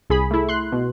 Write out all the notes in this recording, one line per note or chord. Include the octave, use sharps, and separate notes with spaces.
C2 G#4 B5
A3 E4
C6 F#6
B2